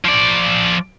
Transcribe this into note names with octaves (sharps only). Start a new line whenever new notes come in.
F3 D5